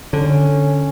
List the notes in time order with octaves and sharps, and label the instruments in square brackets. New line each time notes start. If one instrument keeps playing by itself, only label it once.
[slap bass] D3 [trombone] C#4